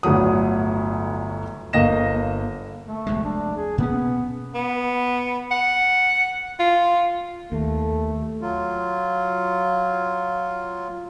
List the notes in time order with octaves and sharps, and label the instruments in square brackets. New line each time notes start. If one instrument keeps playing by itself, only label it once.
[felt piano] G1 D2 A2 F#3 D#6
[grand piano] G1 A#3 D#5 A#6 E7
[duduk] A3
[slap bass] F1 D2 G#3
[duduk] D4
G#4
[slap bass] B2 A#3 C#4 [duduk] B3
[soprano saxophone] B3
F#5
F4
[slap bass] D#2 [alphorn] A3
[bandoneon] F#3 F4